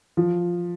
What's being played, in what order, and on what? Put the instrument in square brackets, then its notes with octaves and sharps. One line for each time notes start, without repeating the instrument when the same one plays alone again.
[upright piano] F3